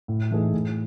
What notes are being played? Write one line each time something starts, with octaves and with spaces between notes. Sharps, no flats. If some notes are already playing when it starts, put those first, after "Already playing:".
A2
E3 A3 D#4 G#4
A2